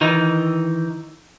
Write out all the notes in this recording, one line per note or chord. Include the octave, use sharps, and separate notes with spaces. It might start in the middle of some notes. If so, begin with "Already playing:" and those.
D#3 E3 D#4